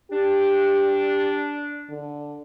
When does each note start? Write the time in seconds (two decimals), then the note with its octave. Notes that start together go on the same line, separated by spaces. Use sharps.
0.11 D4 G4
1.89 D3